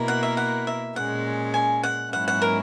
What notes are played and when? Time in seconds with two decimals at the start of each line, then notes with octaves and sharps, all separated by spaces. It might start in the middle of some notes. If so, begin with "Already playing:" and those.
Already playing: B2 A#3 E4 A#4
0.08 F#5
0.23 E5
0.37 F#5
0.67 E5
0.96 A#2 G#3 C#4 F#5
1.54 G#5
1.83 F#5
2.12 G#2 F#3 A#3 C#4 E4 F#5
2.28 F#5
2.42 A#4